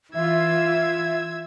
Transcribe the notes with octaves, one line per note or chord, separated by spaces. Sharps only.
E3 F4 E5 E6 G#6